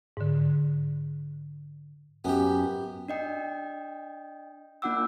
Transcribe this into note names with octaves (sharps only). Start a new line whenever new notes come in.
G#2 D3
F#2 B3 G4
D4 D#5 G5
A#3 D4 F4 F#5 D6 E6